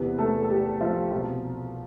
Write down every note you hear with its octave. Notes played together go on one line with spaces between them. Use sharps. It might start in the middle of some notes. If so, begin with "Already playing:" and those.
Already playing: E2 C3 E3 B3 B4
A3 A4
A4
G3 G4
F3 F4
C2 B2 F3 F4